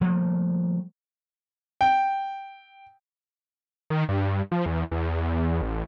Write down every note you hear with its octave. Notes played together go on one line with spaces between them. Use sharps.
F3 G3 A3 A#3
G5
D#3
G2
F3
E2
E2
A1